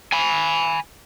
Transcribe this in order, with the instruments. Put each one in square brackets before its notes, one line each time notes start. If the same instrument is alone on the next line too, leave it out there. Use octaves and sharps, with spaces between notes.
[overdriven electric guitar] G#5 B5